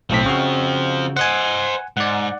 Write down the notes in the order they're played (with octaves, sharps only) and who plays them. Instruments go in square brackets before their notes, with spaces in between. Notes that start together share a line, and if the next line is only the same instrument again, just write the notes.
[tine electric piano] B1 A2 B6 [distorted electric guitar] F3 C4
[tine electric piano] C#3 F#4
[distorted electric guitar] C5 D#5 [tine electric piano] F#5 G#5
[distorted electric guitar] G#2 [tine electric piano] D5 F#5